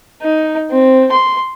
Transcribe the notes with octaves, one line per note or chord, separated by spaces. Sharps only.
D#4
C4
C6